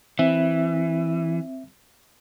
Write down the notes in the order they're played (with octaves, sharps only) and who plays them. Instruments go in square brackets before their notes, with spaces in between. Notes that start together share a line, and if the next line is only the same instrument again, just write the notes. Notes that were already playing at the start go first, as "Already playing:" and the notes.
[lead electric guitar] E3 [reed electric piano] C4 E5